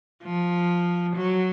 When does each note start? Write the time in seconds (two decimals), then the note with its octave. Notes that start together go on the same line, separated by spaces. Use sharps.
0.23 F3
1.16 F#3